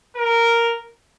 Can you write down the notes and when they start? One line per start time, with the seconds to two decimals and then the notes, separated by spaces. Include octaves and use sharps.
0.16 A#4